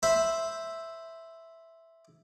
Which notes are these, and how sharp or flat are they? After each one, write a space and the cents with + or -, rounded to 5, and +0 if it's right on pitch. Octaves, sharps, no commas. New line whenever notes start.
C5 +0 E5 +0 B5 +0